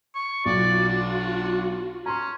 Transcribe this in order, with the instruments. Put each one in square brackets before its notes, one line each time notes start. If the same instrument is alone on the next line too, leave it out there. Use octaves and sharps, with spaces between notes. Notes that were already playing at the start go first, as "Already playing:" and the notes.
[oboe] C#6
[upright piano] B1 [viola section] F4 F#4 [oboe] D5
[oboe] D4
[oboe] C#4 [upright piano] A#5 C6